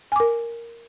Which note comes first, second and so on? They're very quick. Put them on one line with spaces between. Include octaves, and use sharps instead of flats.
G#5 D6 A#4